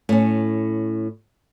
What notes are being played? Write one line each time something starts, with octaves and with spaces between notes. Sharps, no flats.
A2 C#4